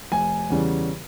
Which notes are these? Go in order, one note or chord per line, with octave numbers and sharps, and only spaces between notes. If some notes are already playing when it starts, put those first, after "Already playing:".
F1 G#5
E2 C#3 G3